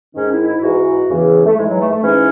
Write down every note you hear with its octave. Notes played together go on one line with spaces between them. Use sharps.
G#2 D#3 C#4
E4
E4
G#2 E3 F#4
E2 C#3 E3
A3
G#2 E3 G#3
F#3
A3
A3
G#2 E3 C#4